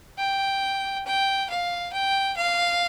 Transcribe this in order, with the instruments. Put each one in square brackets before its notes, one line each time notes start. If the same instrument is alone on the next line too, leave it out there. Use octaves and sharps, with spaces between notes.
[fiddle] G5
G5
F5
G5
F5